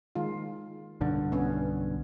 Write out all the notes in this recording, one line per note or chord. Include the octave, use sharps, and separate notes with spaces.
D#3 G#3 F4
B1 G2 D3
B3 C#4